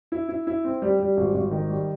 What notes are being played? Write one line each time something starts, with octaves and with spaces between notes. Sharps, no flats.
E4
E4
E4
C4
G3
G3
G#1
G#1
D#3
G3